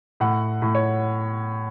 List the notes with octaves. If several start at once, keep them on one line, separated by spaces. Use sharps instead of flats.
A2 F#5
A2
C#5